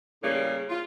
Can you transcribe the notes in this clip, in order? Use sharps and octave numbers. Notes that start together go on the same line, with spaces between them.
A2 C#3 G3 A#3
F4